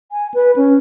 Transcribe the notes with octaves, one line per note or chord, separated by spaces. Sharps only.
G#5
B4
C#4